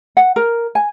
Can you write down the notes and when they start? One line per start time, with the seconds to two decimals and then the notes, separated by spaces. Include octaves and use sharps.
0.17 F#5
0.36 A#4
0.75 G#5